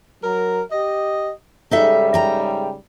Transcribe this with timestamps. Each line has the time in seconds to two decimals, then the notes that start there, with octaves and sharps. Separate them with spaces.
0.23 F#3 A#4
0.71 G4 D#5
1.71 G#2 C#3 G3 D#4 A4 E5
2.14 G5 A#5